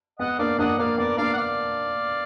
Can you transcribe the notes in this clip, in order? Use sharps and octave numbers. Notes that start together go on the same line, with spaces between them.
B3 D#5 F#5
A#3 D4 D5 F5
A#3 D4 D#5 F#5
A#3 D5 F5
B3 A#4 D5
A#3 D4 D5 F5
F#5
D5 F5